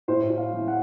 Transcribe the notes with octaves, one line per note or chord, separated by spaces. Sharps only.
A2 C5
A2
F5
E3
F#5